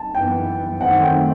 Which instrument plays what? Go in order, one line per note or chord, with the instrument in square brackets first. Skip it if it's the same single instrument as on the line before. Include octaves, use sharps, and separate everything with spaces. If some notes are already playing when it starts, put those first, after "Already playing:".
Already playing: [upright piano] A5
[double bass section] F#2 E3 B3 [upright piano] G5
[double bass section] F#2 D#3 F#3 A3 C4 [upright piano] F#5
[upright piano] G5